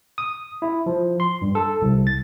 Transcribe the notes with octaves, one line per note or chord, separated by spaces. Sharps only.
D#6
E4
F3
C6
G2
A4
C2
A6